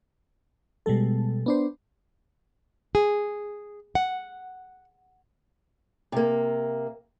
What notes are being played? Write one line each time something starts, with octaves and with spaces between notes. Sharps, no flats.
B2 G3 G#3 A4
B3 D4 C5
G#4
F#5
C3 A#3